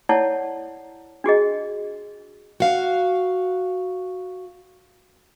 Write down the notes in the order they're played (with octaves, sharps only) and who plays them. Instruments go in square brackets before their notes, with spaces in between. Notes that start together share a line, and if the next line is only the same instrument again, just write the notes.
[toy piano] E4 C#5 D5 F#5 A5
D4 F#4 G#4 D#5
[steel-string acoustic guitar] F#4 F5